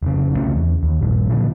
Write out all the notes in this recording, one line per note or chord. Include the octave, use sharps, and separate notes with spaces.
F1 C#3
C2 C#3 A3 C#4
E2
D#2
A#1 G2
A#2 D3 F3 F#3